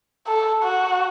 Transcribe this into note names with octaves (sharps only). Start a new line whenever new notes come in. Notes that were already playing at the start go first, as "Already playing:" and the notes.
A4
F#4